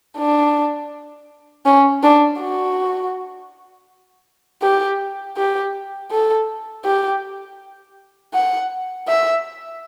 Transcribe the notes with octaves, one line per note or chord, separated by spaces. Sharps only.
D4
C#4
D4
F#4
G4
G4
A4
G4
F#5
E5